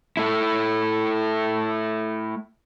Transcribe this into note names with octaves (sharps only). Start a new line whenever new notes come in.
A3 E4